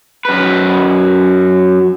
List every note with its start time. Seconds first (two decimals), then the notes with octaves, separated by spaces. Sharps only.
0.25 F#2 B4